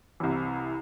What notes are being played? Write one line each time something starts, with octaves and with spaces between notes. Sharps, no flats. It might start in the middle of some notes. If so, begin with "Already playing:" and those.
C2 C3 E3